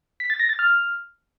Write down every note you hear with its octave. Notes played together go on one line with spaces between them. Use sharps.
B6
A6
A#6
A6
F6